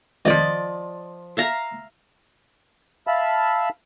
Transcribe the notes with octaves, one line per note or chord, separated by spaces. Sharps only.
F2 D#3 F3 D5 D#5
E5 F5 A#5
E5 F5 A5 B5